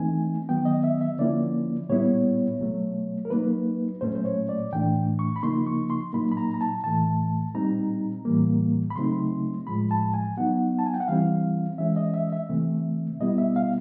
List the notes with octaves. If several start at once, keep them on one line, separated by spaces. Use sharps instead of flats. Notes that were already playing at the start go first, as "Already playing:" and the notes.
Already playing: E3 A3 C4 D#4 G#5
D#3 F#3 B3 G5
D#5
E5
E5
D3 F3 A#3 C#4 E4 D5
A#2 G3 B3 E4 C#5
B2 F#3 A3
A#4
F#3 A#3 D#4 B4
A#2 F#3 A3 C#4 C5
C5
C#5
D5
A2 E3 A3 D4 G5
C#6
B5
C#3 F3 A#3 D#4 C6
C#6
C6
A#2 F#3 A#3 D#4 B5
B5
A#5
A#5
A5
A2 E3 A3 A5
A#2 G3 C4 D#4 A#5
A2 E3 G3 A#3
B5
C#3 F#3 A3 C4 D#4 C6
A2 F3 G#3 B5
A5
G#5
F#3 B3 D#4 F#5
A5
G#5
G5
F#5
E3 G3 C4 E4 F5
E3 G#3 C#4 E5
D#5
E5
E5
C3 E3 A3 C4
B2 G3 B3 E4 D#5
E5
F5